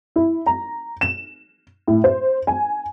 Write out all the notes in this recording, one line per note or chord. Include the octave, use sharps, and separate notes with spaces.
E4
A#5
E7
A2
C5
G#5